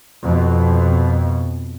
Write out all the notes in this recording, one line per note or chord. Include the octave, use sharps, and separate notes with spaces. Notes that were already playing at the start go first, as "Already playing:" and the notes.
F2 B2